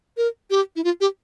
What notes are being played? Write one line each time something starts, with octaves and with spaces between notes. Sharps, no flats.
A#4
G4
E4
F4
G4